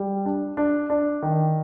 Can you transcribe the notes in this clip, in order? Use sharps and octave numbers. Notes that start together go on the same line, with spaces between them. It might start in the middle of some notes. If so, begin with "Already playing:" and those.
Already playing: G3
D4
D4
D4
D#3